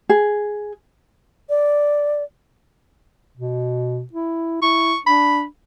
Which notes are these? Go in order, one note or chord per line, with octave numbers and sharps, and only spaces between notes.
G#4
D5
B2
E4
E4 C#6
D4 B5